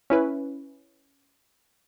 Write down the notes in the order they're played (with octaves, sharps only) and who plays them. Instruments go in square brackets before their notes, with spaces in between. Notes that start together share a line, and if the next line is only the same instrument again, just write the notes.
[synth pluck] C#4 E4 B4